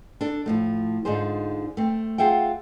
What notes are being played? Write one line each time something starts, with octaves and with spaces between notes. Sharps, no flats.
D4 A4
A2 F3 A3
G#2 D3 D#4 F4 G#4 C5
A3 C4
F4 G#4 E5 F#5 G5